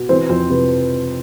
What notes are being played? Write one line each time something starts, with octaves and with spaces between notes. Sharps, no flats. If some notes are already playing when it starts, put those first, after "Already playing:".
Already playing: B2
E3 C4 C5
F2 C4 C5
C3 B4